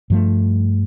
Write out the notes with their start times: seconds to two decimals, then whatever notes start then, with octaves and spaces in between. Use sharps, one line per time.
0.10 G2 F3 A3